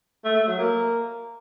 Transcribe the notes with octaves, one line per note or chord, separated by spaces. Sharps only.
A3
A3
F#3
A#3